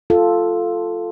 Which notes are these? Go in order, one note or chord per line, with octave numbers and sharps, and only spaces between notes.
F4 A4